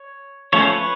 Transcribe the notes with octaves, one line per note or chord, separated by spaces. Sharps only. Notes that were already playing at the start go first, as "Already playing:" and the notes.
Already playing: C#5
F3 A3 C#4 C#5
C5
B4 C#5